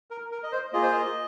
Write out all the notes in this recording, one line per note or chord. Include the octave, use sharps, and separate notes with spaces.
A#4
A#4
D#5
C5
A#3 F4 G#4 D#5
C5
D#5